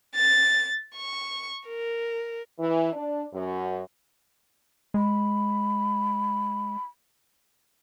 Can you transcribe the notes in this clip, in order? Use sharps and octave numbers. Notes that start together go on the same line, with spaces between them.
A6
C#6
A#4
E3
D4
F#2
G#3 B5